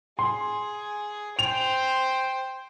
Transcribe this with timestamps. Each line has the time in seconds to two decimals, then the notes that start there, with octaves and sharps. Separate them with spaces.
0.19 G#4 C6
1.39 C5 G5 F7